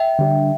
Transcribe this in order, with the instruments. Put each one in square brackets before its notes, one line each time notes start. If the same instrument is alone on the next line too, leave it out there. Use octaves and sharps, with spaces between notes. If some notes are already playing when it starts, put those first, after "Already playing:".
Already playing: [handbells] E5 G5
[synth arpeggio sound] D3 G3 D4